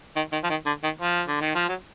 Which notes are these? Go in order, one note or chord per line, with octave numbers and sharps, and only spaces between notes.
D#3
D#3
F3
D#3
D3
D#3
F3
D3
D#3
F3
F#3